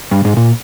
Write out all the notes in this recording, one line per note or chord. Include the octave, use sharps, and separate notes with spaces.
G2
G#2
A#2